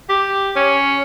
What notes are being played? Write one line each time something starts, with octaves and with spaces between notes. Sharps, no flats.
G4
C#4